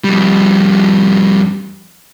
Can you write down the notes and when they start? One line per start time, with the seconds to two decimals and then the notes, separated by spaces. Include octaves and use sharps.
0.04 F2 G3